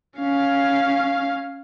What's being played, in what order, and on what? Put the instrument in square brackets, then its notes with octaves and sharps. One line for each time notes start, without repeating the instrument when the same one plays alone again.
[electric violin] C#4 F5